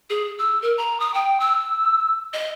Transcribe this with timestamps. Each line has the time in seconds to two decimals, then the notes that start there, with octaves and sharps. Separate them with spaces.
0.10 G#4
0.38 E6
0.62 A#4
0.78 A#5
1.00 D#6
1.14 G5
1.40 E6
2.33 D#5